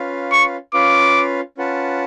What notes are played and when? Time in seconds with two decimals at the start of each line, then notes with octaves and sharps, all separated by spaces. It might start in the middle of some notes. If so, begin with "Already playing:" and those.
Already playing: C#4 F4 B4 F5
0.32 C#6
0.74 C#4 F4 B4 F5 D6
1.58 C#4 F4 B4 F#5 A5